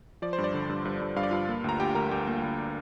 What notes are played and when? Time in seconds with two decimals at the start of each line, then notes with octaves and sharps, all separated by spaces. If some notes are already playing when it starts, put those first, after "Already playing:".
0.22 F3 D5
0.33 C5
0.38 G2
0.44 D5
0.54 D3
0.69 G2
0.85 G2
1.01 G2
1.16 G2 F5
1.23 D5
1.31 G2 F4 F5
1.49 A#3
1.64 D2 A#5
1.80 D2 G4 G5
1.95 D2 A#4 A#5
2.11 D2 G4 G5
2.27 A#3
2.43 D2